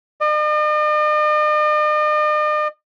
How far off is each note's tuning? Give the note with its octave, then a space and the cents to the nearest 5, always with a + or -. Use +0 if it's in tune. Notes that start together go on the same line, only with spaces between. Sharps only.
D#5 -45